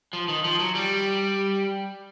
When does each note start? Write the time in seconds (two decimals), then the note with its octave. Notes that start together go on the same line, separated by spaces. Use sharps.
0.13 F3
0.28 D#3
0.44 F3
0.60 F#3
0.75 G3